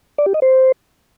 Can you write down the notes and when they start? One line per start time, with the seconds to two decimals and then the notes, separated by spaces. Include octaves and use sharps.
0.18 D5
0.26 G4
0.34 D#5
0.42 C5